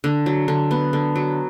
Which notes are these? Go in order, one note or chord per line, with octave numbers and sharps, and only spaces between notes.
D3
F#3
D3
B3
D3
F#3